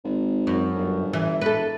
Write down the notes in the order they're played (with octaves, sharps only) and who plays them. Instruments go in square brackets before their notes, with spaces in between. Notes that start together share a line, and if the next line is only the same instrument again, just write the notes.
[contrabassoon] G#1
[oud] F#2
[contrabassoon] G1
[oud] E3
[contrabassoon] E1 [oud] A4 B4